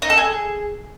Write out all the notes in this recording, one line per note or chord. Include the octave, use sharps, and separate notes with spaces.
D#4
A4
G#4